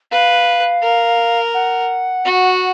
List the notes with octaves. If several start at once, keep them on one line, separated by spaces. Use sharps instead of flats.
B4 F5
A#4
F#5
F#4